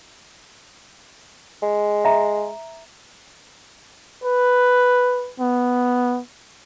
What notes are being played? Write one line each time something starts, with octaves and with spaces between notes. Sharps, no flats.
G#3
E5 A#5
B4
B3